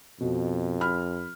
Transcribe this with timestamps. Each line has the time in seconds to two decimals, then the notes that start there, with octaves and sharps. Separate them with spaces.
0.20 F2 B2
0.81 B5 F6